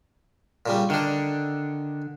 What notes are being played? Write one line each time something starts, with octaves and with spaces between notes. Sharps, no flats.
A#2 C#3 G3
D3 D#3 D4